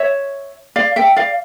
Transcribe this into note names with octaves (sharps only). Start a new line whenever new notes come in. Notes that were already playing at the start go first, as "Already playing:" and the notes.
Already playing: C#5 E5
D5 F5
E5 G5
D5 F5